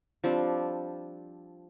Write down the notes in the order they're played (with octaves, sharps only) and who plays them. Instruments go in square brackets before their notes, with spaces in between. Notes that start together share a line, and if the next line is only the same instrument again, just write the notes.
[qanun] F3 G3 C4 D4